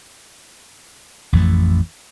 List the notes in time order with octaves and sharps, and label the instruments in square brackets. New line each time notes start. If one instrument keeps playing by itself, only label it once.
[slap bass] A1 F2 E3 A3